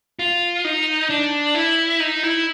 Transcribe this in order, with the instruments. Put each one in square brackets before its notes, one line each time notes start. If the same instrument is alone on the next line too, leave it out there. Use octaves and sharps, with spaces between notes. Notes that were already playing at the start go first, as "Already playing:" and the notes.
[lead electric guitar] F4
D#4
D4
E4
D#4
E4